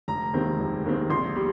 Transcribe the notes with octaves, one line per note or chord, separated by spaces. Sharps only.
F1 A#5
D#2 D#3 G#3 C4
F1
D#2 D#3 G#3 C4
A#1 C6
G3